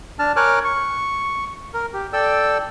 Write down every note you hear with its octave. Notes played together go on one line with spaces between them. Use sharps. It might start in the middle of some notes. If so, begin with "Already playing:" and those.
D4 A5 F6
A#4 C#5 G#5 D6 F6 F#6
C#6
A#4
G4
A4 D5 G5 E6